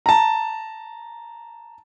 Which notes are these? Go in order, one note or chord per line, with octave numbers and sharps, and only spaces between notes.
A5 A#5